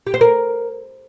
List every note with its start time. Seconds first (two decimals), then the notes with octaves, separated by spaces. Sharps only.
0.07 G4
0.14 C5
0.21 A#4